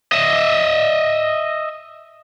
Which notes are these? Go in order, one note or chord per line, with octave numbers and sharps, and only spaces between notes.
D#5 E5